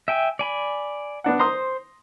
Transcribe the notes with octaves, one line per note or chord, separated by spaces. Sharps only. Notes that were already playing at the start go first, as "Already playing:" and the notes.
E5 G5 G#5
D5 G#5 B5
B3 D4 F#5
C5 A#5 C6 D#6